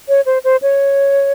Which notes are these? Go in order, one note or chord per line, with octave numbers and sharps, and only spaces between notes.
C#5
C5
C5
C#5